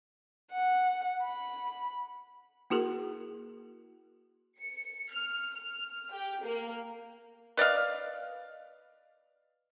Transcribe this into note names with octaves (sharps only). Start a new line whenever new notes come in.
F#5
B5
A#3 E4 F#4 G#4 A#4
C#7
F6
F6
G4
A#3
B4 D5 D#5 F5